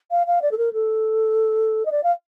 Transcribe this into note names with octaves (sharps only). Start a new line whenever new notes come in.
F5
F5
D5
A4
A#4
A4
D#5
D5
F5